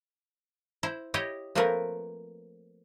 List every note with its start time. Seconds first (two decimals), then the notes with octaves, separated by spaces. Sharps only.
0.83 E4 C5
1.14 E4 G4 C#5 D#5 G5
1.55 F3 A3 A#3 C4 A#4 B4